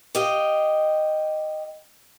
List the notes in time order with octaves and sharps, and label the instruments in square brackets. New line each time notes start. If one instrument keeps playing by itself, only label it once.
[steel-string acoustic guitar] G4 D#5 F5